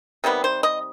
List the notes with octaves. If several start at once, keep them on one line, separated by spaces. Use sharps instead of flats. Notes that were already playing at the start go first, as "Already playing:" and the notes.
C3 D#3 G3 B3
C5
D#5